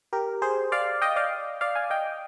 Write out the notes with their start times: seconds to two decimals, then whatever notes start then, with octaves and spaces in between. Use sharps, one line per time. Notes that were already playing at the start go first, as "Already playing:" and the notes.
0.13 G4 A#4
0.42 G#4 C5
0.72 D5 F5
1.02 D#5 G5
1.16 D5 F5
1.61 D5 F5
1.75 F5 G#5
1.90 D#5 G5